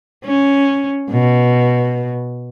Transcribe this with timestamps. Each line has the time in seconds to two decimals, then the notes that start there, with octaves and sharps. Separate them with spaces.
0.25 C#4
1.11 B2